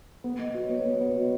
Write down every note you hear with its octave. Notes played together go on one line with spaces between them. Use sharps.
B3
B3 D#5
F#4 D#5
C#5
B3 B4
C#5
B3 B4
B3 C#5
F#4 D#5